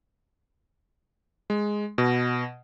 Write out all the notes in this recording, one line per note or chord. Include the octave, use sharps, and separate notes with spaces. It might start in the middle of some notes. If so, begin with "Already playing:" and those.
G#3
B2